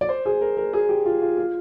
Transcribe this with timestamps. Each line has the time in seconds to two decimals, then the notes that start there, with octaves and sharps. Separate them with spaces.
0.01 D5
0.09 C5
0.26 G#4
0.41 A#4
0.57 A#4
0.73 G#4
0.89 G4
1.06 F4
1.22 F4
1.37 F4